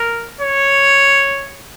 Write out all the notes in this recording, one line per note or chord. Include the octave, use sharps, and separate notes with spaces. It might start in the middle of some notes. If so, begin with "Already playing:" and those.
Already playing: A#4
C#5